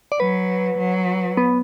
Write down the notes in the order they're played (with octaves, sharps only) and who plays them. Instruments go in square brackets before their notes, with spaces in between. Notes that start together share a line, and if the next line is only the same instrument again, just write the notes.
[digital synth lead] D5
[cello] F#3 [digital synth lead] B4
[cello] F#3
[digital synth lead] B3